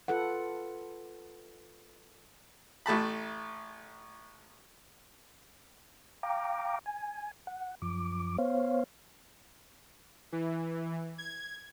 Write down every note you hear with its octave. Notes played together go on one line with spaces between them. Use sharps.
F4 A4 B4 F#5
A1 A3 A5 B5
F5 G5 A#5 D6
G#5
F#5
F#2 F3 D6
B3 C5 C#5 F5
E3
G#6